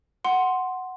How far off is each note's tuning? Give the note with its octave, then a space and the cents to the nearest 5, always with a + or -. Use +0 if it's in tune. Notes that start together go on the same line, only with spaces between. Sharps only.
F#5 +5 C6 +0